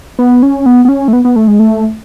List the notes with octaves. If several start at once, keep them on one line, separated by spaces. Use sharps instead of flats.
B3
C#4
B3
B3
C#4
A3
B3
B3
A3
G#3
A3